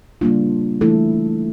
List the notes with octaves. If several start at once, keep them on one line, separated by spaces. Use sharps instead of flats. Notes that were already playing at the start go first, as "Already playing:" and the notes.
C#3 G3 A#3 D4 F4
E3 A3 E4 A4